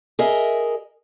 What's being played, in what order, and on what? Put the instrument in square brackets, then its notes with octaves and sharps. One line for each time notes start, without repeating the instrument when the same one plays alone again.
[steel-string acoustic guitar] G#4 A#4 D#5 E5